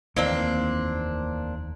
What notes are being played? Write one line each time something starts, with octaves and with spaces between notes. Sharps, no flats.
F1 D#2 E3 A#3 C4 D4